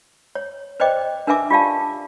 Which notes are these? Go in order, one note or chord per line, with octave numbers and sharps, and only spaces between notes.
C#5
B4 C5 D5 D#5 G5 D6
D4 A#4 B4 E5 G#5 D6
F4 G4 D5 F5 A5